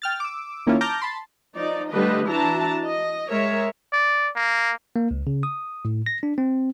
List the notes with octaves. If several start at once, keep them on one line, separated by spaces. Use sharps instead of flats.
G5 F6 A6
D6 E6
D#3 A#3 C#4 E4 F4
A5 A#5 D6 F6 G6 A#6
A5 B5 C6
F3 D#4 D5
D3 G3 A3 D4 B4 D#5
E3 D4 E4 F#4 A5 A#5
D#5
G#3 A#4 C#5 E5
D5
A#3
A#3
C#2
C#3
D#6
A2
A#6
D4
C4